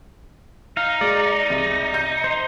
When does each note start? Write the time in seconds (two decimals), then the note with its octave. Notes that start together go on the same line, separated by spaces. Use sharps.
0.77 D#4 F5
1.01 G#3 D5
1.50 C2
1.94 G6
2.24 C5